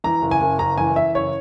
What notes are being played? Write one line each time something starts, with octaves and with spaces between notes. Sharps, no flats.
E3 A#5
F#1
G#5
F#1
F#1 A#5
E3 G#5
E3 E5
F#1 C#5